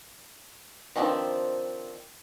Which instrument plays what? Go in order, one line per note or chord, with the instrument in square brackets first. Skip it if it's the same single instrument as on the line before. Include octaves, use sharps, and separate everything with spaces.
[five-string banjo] D#3 F3 C4 D4 B4